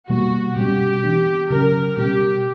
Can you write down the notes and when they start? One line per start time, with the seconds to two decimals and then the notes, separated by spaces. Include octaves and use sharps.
0.09 B2 G3 A#3 F#4
0.56 B2 G3 C#4 G4
1.04 E3 B3 D4
1.50 C#3 F#3 C#4 A#4
1.97 B2 G3 C#4 G4